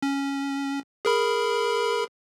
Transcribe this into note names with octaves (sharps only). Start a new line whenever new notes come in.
C#4
G#4 A#4 B5